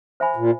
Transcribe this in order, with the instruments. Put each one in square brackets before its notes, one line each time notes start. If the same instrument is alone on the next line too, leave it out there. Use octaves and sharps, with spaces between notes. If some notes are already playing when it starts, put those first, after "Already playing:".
[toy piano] C5 E5 G#5 B5
[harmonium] A#2